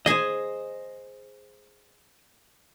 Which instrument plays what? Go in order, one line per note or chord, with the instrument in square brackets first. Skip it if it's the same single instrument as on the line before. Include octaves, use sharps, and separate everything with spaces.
[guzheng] G#4 G#5 [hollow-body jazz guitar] C5 D#5